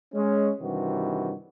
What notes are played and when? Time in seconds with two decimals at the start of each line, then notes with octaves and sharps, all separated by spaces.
0.14 G#3 C#4
0.60 G2 C3 D#3 E3 F#4